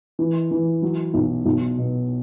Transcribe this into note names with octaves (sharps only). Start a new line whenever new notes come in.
E3
E3
F#3
B1
B1
B2